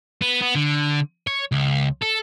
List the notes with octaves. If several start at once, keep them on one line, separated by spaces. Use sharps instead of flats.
B3
B3
D3
C#5
C#2
A4